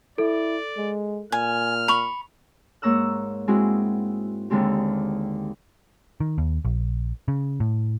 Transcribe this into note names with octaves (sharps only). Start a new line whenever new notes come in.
E4 A4 D5
G#3
A#2 G#5 F6
B5 C#6 F7
G#2 A#3 C#5 A#5 E6 F#6
G#3 C4 E4 F#4 G#4
D#2 D3 G#3 C4 G4
D#3
D#2
A#1
C#3
A2